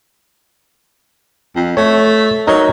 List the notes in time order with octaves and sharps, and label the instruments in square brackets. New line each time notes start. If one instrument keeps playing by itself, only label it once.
[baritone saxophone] F2
[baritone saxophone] A3 [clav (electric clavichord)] C#5
[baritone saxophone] F#3 [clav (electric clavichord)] D#4 A#4 C#5